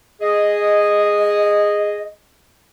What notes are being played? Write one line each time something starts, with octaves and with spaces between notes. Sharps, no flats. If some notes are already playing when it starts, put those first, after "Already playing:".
G#4 D#5